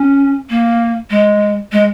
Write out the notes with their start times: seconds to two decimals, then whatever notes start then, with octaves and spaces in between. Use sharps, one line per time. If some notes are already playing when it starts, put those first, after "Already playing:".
Already playing: C#4
0.50 A#3
1.10 G#3
1.72 G#3